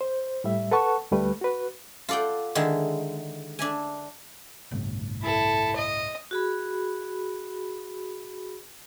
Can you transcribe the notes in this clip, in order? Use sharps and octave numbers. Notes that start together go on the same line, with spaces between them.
C5
A2 G3 E5
A4 B4 F#5 A5 C#6
D2 G3 A3 B4
F#4 B4
F4 A4 D5 F#5 G5
D3 D#3 G#3 E4
D4 E5 G#5
G1 C2 A2
E4 A4
D#5
F#4 G#4 B5